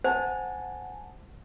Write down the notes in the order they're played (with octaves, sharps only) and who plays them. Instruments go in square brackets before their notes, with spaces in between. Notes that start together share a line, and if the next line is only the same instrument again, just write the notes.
[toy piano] C5 [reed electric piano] F#5 G#5 A5